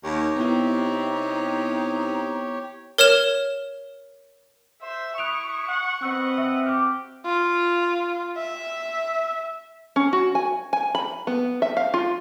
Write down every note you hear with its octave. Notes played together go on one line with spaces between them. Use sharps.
D#2 G4 C#5
C3 B3 D#4 E4
A#4 C#5 F6 E7
C5 E5
E4 C#6 D#6 F#6 D7 F7
F#5
C4 B4 D#5 F#5 E6 F#6
E5 E6
F#4 G4 D6 F6
F4
E5
C#4
F#4
G#5
G#5
B5
B3
E5
F5
F4